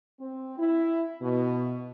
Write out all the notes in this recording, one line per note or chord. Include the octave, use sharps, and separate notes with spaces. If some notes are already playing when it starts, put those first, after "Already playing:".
C4
E4
B2